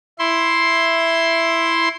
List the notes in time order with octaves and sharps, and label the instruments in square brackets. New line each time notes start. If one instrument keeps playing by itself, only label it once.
[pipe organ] E4 C6